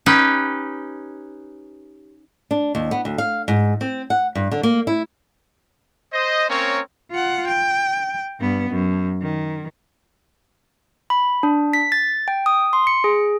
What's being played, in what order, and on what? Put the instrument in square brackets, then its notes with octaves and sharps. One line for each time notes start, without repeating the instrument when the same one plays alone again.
[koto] C#4 D#4 G4 B4
[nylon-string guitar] D4
D#2
B3
D2
F5
G#2
C4
F#5
G2
D3
A#3
E4
[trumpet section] C5 D#5
A#3 C4 C#4 A#4 C#5
[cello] F4 F#5
G5
G2 B3
F#2
D#3
[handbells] B5
D4
B6
A6
G5
D#6
C6
C#7
G#4